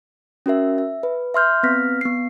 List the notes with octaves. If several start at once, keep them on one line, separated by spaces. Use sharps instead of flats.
C#4 F#4 A#4 E5
E5
B4
E5 C6 F6 G6
B3 C4 B4 F6 A#6 B6
B3 C7